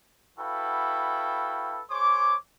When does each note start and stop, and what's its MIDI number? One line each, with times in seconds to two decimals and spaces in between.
0.38 1.80 64
0.38 1.80 66
0.38 1.80 69
0.38 1.80 71
0.38 1.80 77
0.38 1.80 79
1.91 2.35 68
1.91 2.35 72
1.91 2.35 73
1.91 2.35 86